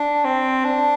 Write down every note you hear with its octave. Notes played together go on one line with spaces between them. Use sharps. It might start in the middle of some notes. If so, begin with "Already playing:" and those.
Already playing: D4
C4
D4